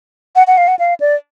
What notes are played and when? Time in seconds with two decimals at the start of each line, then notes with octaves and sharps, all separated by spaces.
0.36 F#5
0.47 F#5
0.58 F5
0.68 F#5
0.79 F5
1.00 D5